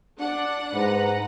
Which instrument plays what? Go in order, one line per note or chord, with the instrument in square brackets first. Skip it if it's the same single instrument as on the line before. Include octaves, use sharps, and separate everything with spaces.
[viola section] D4 D5 [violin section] F#5
[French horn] G#2 [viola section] B4 A#5